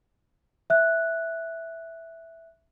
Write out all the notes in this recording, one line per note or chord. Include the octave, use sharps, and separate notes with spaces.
E5 F#6